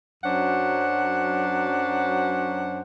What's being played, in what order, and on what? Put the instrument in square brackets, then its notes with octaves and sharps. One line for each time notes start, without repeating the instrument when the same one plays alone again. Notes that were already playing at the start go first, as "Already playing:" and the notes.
[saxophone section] F#2 F#3 C#4 D4 C5 F#5